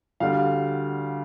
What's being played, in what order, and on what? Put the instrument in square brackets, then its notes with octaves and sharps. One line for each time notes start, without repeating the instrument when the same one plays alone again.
[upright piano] D2 D3 G3 F5